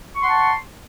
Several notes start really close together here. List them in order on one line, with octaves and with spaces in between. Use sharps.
C#6 C6 F#5 A5